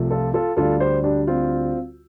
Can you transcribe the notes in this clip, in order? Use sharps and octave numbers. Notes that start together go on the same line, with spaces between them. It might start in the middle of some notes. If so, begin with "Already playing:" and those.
Already playing: C2 C3 F3 A3
F4 A4
F4 A4
D2 D3 G3 F4 A4
G4 C5
D4 G4
C4 F4